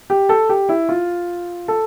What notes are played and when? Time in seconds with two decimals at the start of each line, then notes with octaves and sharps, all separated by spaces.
0.10 G4
0.29 A4
0.49 G4
0.69 E4
0.89 F4
1.68 A4